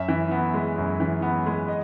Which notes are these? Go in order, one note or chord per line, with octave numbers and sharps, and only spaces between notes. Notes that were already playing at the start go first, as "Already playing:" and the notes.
Already playing: F#2 E5
E3
B3
G#3
F#2
E3
B3
G#3
D#5